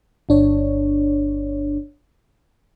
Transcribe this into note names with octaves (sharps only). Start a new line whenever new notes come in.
G1 D4 C#5